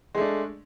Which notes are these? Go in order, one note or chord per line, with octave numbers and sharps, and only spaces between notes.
G#3 A3 D4